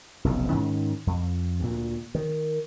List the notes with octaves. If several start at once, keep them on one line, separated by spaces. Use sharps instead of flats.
F1 B1 C#3
G#2 D#3 C#4
F2
D2 A#2
D#3